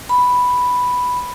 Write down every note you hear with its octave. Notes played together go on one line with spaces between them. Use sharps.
B5